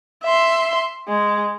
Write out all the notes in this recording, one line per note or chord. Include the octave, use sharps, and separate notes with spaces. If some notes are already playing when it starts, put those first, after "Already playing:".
E5 C6
G#3